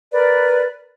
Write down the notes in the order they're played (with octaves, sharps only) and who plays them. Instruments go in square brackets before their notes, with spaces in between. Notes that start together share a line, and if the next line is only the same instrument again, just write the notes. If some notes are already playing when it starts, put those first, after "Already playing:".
[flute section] A#4 B4 D5